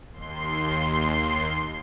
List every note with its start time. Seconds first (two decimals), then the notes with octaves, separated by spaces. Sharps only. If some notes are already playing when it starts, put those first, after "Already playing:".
0.13 D#2 C6 C7